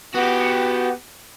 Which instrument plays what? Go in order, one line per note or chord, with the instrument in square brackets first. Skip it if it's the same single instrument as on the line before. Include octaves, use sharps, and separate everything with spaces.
[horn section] B3 [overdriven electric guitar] F#4 G4